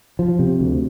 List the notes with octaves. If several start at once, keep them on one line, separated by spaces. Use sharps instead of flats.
F3
C3
D2